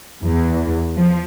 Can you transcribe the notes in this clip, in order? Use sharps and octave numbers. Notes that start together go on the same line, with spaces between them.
E2
F3